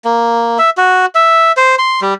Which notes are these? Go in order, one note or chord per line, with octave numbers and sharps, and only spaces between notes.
A#3
E5
F#4
E5
C5
C6
G3